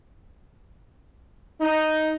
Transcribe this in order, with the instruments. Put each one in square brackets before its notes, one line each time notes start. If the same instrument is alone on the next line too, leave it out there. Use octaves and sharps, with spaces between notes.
[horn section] D#4